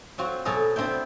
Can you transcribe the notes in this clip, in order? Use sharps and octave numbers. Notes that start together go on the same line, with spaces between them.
F#3 C4 F4 F#4
B2 F#3 G#4 A4 A#5
B3 C4 D4 E4 G5